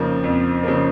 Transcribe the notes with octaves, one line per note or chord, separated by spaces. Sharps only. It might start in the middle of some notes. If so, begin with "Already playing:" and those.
Already playing: F2 C#3 F3 A#3
F2
C#3 F3 A#3